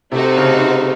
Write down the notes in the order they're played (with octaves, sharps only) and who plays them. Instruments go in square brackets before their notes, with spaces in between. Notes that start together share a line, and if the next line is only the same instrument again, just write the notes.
[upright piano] C3 [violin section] A3 D#4 F#4 C5
[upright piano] C#3